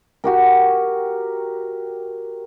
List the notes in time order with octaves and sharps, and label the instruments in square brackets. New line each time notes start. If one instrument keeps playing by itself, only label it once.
[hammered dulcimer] F#4 G4 A#4